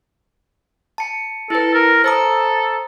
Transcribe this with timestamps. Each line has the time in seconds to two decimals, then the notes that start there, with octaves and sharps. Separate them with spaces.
0.98 A5 C#7
1.50 E4 A4 B4
1.74 A#4
2.04 A4 C5 A#5 D#6